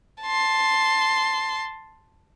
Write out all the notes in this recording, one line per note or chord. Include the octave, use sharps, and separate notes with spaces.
A5 C6